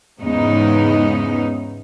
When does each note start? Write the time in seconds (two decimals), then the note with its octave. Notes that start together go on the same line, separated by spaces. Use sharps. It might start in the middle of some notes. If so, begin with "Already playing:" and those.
0.21 E2 G#2 C#3 B3 D#4